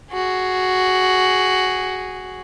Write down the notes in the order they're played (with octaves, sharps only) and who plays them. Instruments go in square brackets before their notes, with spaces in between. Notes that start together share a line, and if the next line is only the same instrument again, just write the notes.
[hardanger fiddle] F#4 G#4